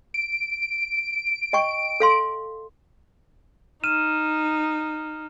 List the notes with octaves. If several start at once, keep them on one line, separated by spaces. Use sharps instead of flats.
D7
D#5 G5 C#6
A4 F5 C6
D#4 F6 D#7 E7